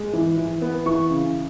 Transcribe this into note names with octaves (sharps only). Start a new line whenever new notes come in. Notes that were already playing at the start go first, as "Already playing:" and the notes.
Already playing: G#3
E3
E3
B3
E3 C#6
C#3